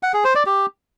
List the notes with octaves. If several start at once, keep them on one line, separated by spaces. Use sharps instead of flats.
F#5
G#4
C5
D5
G4